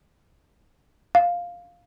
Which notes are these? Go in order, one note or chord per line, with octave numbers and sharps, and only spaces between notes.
F5